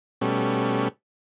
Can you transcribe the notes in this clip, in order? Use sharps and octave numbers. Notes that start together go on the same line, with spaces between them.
B2 G3 A3 C#4